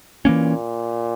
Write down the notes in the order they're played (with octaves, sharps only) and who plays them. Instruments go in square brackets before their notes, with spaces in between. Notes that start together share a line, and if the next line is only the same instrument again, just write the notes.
[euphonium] A#2 [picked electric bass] E3 A#3 C#4